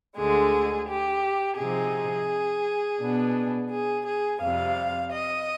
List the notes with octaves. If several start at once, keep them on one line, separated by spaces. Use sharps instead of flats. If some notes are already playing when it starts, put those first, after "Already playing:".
D2 D3 G#3 G#4
G4
C3 F3 C4 D#4 G#4
B2 B3 D4
G#4
G#4
F2 C3 G3 F5
D#5